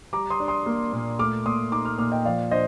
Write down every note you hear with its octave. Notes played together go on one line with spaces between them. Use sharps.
G3 A#5 D6
C6 D#6
D4
C6 D#6
A#3
A#2
A3 D6 F6
A#2 C6 D#6
D#4 A#5 D6
D6 F6
A#2 D6 F6
D#5 G5
F3 D5 F5
D4 C5 D#5